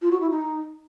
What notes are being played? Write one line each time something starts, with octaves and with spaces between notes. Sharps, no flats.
F4
F#4
E4
D#4